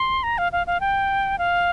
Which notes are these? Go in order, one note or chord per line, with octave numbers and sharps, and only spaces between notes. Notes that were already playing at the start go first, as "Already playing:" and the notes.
Already playing: C6
A#5
F5
F5
F5
G5
F5